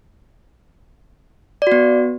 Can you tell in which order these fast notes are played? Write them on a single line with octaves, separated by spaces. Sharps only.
D5 F#4 B3